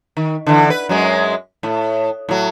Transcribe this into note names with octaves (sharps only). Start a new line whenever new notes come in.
D#3
D3 E3
B4
F#2 F#3 G#3
A2
A2 F#3